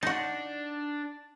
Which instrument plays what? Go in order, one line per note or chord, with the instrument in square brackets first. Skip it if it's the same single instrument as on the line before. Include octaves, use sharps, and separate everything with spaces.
[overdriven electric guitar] D4 [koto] D#4 F#4